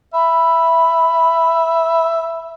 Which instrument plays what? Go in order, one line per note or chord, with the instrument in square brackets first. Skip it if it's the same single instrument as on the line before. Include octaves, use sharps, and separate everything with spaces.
[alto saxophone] E5 [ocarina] B5